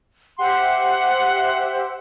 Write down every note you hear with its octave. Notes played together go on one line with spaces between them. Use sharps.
G4 C5 E5 F#5 C6